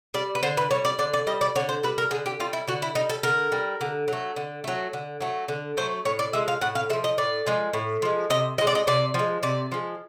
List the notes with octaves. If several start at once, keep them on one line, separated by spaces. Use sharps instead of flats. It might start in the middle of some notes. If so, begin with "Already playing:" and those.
G3 D5
B4
D3 C5
B4
G3 C#5
D5
D3 D5
D5
G3 D#5
D5
D3 C#5
C5
G3 B4
A#4
D3 G#4
G4
G3 F4
E4
D3 F#4
E4
G3 D#4
A4
D3 A#4
G3
D3
F#3 A3
D3
F#3 A3
D3
F#3 A3
D3
F#3 A3 C5
A2 C#5
D5
F3 G#3 E5
F5
A2 F#5
F5
G#3 E5
F3
D#5
A2 D5
F3 G#3
A2
F3 G#3
C3 D#5
F3 G#3 D#5
D5
D#5
C3 D5
F3 G#3
C3 D5
F3 G#3